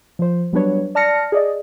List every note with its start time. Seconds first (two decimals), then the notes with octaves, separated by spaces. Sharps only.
0.19 F3 C5
0.53 F#3 G3 B3 D4 B4 C#5
0.95 D5 A5 F6 A#6 C#7
1.32 G#4 D5 D#5